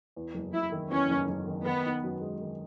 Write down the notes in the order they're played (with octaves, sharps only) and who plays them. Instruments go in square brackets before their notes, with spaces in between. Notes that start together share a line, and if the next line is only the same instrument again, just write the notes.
[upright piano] E2
F#1
[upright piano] F#1 [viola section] E4
[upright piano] D#3
[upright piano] E2 [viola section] C#4
[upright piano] F#1
F#1
D#3
[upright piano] D#3 [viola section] B3
[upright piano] D#4
F#2
G#3
D#3